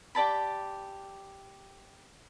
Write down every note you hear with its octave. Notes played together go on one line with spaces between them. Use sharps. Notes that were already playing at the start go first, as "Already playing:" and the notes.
G4 D5 A5 B5